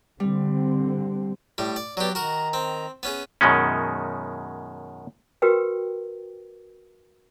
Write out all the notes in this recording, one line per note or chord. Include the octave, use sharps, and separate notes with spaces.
D3 G3 C4
A2 G3
D5
F#3 B3 G4 D5
D#3 F#4 A#4 A#5
C4
B3 C#4 G#4
F#2 B2 D#3 G#3 C#4
F#4 G4 A#4 B4 G5